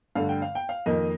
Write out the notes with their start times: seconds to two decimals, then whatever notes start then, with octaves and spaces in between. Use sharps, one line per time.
0.15 G2 D3 A3 F5
0.29 G5
0.42 F5
0.55 G5
0.69 F5
0.86 F2 D#3 A#3 D#5